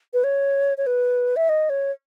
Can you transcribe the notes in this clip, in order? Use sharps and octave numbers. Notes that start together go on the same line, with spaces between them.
B4
C#5
C#5
B4
E5
D#5
C#5